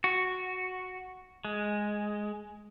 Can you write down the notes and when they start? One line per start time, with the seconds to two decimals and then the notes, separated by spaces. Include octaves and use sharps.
0.04 F#4
1.45 G#3